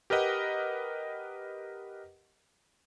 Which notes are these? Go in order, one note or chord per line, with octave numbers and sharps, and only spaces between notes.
G4 A#4 B4 D#5 F#5